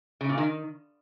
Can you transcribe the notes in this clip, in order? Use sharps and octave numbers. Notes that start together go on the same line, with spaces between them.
C#3
A#2
D#3